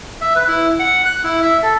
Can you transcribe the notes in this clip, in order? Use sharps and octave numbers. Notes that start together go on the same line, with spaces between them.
E5
B4
E4
F#5
F#6
E4
E5
A4